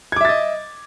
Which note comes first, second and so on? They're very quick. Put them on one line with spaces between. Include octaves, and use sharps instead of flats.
G#6 D6 E5 A6 D#5